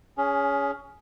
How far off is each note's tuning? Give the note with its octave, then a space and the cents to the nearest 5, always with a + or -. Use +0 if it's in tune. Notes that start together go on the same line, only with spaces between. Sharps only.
C#4 +20 G#4 +0